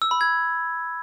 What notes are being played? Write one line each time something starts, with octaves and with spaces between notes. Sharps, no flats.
E6
B5
G#6